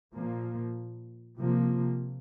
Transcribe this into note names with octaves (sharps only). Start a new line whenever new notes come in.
A#2 F3 A#3
C3 F3 A#3